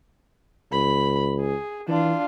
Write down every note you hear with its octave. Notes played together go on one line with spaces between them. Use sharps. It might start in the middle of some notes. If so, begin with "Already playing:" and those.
C#2 B5
G#4
E3 D4 F4